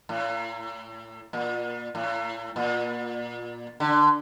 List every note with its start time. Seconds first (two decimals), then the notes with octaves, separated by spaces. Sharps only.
0.09 A2
1.33 A#2
1.95 A2
2.56 A#2
3.80 D3